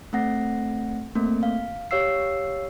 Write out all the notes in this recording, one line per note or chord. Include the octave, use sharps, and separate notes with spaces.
A3 C4 F#5 A#6
A3 A#3 C4
F5
G4 C#5 F5 E6 C7